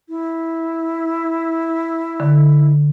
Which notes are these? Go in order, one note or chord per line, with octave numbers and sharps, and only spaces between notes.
E4
D3